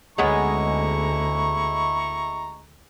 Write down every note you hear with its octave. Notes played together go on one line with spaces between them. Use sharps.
D2 G#3 B3 C#4 E4 A#5 C#6